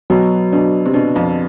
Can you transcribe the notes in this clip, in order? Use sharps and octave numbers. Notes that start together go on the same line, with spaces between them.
B2 F#3
B2 D4
C3
B2 D4
F2